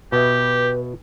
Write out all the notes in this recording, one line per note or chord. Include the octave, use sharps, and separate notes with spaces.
B2 G4 B4 E5